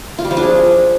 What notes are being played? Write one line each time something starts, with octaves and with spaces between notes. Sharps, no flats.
F4
G3
F3
D4
G#4